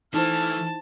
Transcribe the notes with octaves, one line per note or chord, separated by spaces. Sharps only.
E3 A3 D#4 E4 C5 A5 F6